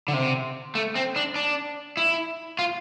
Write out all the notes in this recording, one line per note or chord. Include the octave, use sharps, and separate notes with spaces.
D3
C3
A3
C4
D4
D4
E4
F4